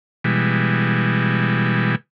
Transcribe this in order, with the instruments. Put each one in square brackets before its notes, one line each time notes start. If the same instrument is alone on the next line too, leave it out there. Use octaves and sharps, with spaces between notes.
[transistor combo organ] B2 E3 G3 G#3